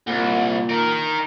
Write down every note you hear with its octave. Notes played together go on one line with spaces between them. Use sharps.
C2 A#2
D#4 A#4